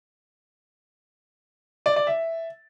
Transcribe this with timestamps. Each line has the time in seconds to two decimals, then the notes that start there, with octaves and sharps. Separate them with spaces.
1.86 D5
1.96 D5
2.07 E5